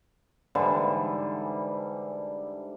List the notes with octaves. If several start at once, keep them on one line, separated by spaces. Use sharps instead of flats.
G#2 D3 E3 G3